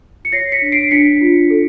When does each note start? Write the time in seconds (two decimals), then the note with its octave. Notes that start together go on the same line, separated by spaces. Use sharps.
0.25 C#7
0.32 C#5 A#6 C7
0.52 B6 C#7
0.62 D4
0.72 C7 D7
0.91 D4 B6 C#7
1.21 F4
1.50 A4